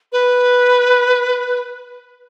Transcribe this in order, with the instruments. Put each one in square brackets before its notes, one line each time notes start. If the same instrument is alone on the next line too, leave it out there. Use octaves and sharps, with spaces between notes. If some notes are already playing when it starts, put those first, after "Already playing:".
[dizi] B4